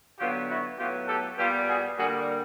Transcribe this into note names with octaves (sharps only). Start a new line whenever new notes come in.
D3 F#3 B3 F4 G4
E4 F#4
A2 F#3 B3 F4 G4
G4 A4
A#2 G3 B3 F4 G4
F#4 G#4
D3 G3 A#3 F#4 G#4